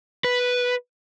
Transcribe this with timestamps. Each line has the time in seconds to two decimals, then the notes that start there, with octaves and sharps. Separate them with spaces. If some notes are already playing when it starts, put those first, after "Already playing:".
0.24 B4